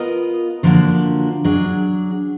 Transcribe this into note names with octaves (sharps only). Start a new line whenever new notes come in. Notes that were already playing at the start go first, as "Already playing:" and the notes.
Already playing: B3 F4 A#4 D#5
D3 F3 A#3 D4 F#4
F#3 D4 G#4